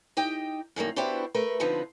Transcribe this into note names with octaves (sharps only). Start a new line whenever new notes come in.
D#4 G4 D#5 G5
F#2 D#3 G3 A#3
B3 D4 E4 F#4 G4 C5
A3 A#4 B4
D3 F3 B3 C4 D#4 B4